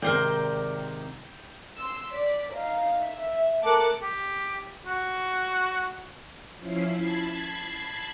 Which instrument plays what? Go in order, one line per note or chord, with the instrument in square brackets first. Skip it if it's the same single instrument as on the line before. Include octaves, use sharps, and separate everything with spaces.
[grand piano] G#2 C3 D#3 [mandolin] A#4 C5 D5 [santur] G5
[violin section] C6 E6
D5 B6
D#4 F5
E5
A3 A#4 A5 D6 F#6 C#7
[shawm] G4
F#4
[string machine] F3 C#4 E4 C7
A5 B5 G#6 C7